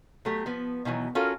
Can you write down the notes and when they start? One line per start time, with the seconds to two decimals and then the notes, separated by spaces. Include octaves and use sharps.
0.25 F#3 A3 G4
0.46 F3 B3
0.85 B2 D#3 E3 F#3
1.15 C#4 F4 F#4 A4 A#4